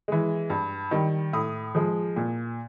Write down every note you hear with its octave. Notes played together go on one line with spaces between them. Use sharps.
E3 G#3
G2
D#3 G3
A2 D#6
F3 G#3
A#2